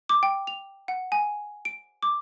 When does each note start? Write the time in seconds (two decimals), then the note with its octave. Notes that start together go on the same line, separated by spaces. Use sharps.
0.09 D6
0.23 G5
0.47 F7
0.88 F#5
1.12 G#5
1.65 D7
2.03 D6